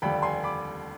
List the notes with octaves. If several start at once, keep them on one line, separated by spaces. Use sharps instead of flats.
F1 D#2 D3 G3 G5 B5
G#5 C6
B5 D6